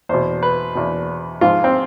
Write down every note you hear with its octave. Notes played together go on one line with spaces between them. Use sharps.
E2 B2 C5
B4
E2 B2
G#2 F3 F4
C4